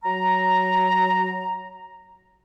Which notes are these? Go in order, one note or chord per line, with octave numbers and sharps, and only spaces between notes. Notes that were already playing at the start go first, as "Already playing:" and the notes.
F#3 A#5